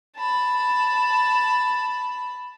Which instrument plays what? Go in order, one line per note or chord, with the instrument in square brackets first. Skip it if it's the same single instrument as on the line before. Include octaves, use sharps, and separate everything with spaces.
[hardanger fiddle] A5 B5